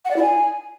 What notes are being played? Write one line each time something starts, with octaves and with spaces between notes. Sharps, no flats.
F#5
D5
E4
G#5